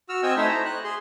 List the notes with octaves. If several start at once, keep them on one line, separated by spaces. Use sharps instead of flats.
F#4 E6 F6
C4 D#5 G5 G#5 E6
A3 D#4 E4 C5 C#5 E5
A#5
F#6
G#4 C6